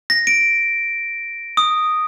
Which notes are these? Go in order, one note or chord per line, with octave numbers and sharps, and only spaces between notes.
A#6
D7
D#6